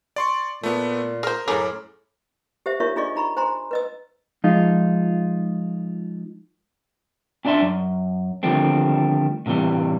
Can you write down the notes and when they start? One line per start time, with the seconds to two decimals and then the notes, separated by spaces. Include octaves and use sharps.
0.16 D5 C6 C#6
0.63 A#2 A3 B3
1.23 G#4 A#4 C5 F6
1.48 F#2 A2 C#3 G#4 A#4 D6
2.66 G4 C5 E5
2.80 D#4 F4 A#4 C#5 E5 C#6
2.96 D4 F4 G#4 D5 D#5 C#6
3.16 D#4 A#5 B5 C#6
3.37 C5 G#5 A#5 C6
3.71 B4 D#5 E6
4.44 F3 G#3 D#4 F4
7.45 C#4 D4 D5 E5 C6
7.62 F#2
8.43 D3 D#3 F3 G3 A3 C4
9.46 A2 C3 D#3 E3 G3